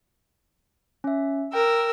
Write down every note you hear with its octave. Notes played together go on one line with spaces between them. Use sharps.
C#4 E5
A#4 G5 E6